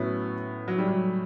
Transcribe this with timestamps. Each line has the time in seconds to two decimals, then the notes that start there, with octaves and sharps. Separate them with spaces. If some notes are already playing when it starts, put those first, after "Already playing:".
Already playing: A2 F#3 B3 C#4 E4
0.68 F#3
0.78 G3
0.88 F#3